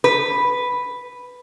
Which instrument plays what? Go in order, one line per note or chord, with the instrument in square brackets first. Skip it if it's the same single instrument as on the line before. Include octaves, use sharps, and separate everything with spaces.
[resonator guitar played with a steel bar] B4